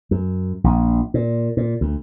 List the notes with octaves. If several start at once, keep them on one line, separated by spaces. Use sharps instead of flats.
F#2
A#1
A#2
A#2
D2